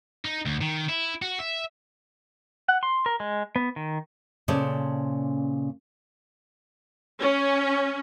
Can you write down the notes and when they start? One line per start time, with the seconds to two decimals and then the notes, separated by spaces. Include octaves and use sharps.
0.25 D#4
0.46 D2
0.61 D#3
0.89 E4
1.22 F#4
1.39 E5
2.68 F#5
2.83 C6
3.06 A#4
3.20 G#3
3.56 B3
3.76 D#3
4.48 A#2 C#3 C#4 A4 C5 D5
7.20 C#4